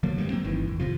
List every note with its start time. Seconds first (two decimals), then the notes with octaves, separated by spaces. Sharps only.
0.03 D3 F3 F#3 A#3
0.18 G2 D#3 G#3
0.30 F#3 A#3 C4
0.44 G1 D#3 E3
0.68 E1
0.80 D#2 C3 F3